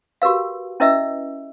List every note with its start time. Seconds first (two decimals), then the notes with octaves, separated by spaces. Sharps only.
0.22 F#4 G4 A#4 B4 F5
0.80 C#4 E4 B4 D#5 E5 E6